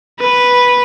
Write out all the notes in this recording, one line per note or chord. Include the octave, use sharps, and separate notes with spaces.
B4